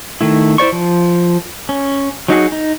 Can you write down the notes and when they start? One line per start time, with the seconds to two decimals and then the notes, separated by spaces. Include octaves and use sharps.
0.21 D#3 A3 E4
0.58 E4 C5 D5 C#6
0.72 F3
1.69 C#4
2.28 F#3 D#4 F#4 G#4
2.52 D#4